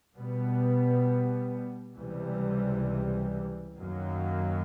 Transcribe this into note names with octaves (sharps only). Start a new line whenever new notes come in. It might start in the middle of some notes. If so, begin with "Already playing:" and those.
B2 G3 B3
C#2 C3 E3 G3
F#2 D#3 F#3 A#3